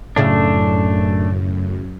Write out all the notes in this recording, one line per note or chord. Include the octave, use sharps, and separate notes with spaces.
F#2 A2 C#3 A3 D4